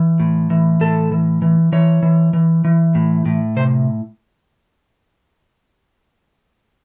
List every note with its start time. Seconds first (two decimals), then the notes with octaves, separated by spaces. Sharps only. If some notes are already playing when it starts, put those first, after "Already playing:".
Already playing: E3
0.20 A2
0.50 E3
0.81 A2 A4
1.12 E3
1.42 E3
1.72 E3 C#5
2.03 E3
2.33 E3
2.65 E3
2.95 A2
3.26 A2
3.56 C3 C5